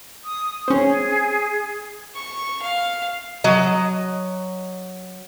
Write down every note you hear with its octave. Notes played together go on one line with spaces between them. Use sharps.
D#6
C4 C#4 G#4
C#6
F5
F#3 D#5